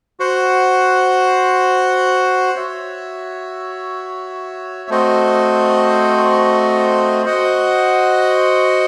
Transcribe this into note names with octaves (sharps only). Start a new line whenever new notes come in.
F#4 C5 F#5
F#4 C#5 E5
A3 C4 F#4 C5 D#5
F#4 C5 D#5 F#5